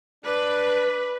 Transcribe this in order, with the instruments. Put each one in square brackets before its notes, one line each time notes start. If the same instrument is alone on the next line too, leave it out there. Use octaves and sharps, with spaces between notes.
[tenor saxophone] D4 [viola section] B4